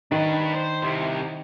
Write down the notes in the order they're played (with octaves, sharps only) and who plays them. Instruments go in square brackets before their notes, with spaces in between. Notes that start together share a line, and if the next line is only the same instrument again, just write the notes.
[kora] D#3 [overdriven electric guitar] D4 B4
[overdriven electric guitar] C5
C2 C3